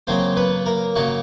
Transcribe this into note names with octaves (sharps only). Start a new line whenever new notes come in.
C#3 F#3 A#3 C4 C5
B3 B4
A#3 A#4
C#3 F#3 A#3 F#4